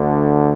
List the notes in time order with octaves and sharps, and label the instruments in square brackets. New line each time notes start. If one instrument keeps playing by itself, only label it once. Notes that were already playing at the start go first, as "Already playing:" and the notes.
Already playing: [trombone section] D2 D3